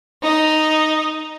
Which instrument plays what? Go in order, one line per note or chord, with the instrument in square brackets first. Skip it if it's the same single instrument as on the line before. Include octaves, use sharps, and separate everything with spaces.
[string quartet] D#4